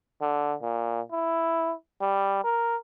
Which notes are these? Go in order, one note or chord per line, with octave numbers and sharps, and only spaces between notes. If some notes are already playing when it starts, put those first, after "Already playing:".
D3
A#2
E4
G3
A#4